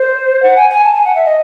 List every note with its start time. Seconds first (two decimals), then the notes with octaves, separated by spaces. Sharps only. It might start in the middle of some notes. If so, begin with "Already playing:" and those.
Already playing: C5
0.43 F#5
0.57 G#5
0.70 G#5
0.84 A5
0.94 G#5
1.05 F#5
1.15 E5
1.25 D#5